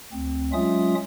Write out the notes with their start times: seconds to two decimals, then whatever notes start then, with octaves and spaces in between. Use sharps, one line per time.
0.13 D2 C4
0.53 F#3 G#3 C#4 F4 E5 D#6